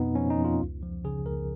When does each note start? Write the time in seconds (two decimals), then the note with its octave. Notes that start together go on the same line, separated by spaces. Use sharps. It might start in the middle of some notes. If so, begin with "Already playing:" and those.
Already playing: F2 B2 B3 D#4
0.15 F3 C#4
0.30 D#4
0.37 F2
0.45 F4
0.61 C#2
0.82 F3
1.04 C#3 G#4
1.26 C#2 A#4